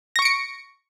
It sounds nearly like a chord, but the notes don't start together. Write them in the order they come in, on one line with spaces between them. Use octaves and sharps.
A#6 C#6 D7 C#7